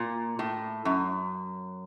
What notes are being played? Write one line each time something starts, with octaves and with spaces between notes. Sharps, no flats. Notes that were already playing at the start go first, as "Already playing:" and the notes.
Already playing: A#2
A2
F#2